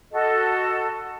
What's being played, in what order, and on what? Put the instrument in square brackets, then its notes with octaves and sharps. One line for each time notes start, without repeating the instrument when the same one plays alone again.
[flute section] F#4 A4 D#5